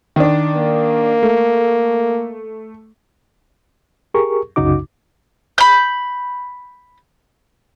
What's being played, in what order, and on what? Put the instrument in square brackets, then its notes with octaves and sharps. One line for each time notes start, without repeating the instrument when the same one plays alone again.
[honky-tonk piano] D#3 D4
[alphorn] A#3
[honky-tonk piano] A3
[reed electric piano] G4 G#4 A#4 C#6
C2 F#2 C#3 D#4 F#4 D6
[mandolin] B5 G6